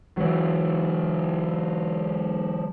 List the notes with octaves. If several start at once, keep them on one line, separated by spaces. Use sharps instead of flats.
E3 F#3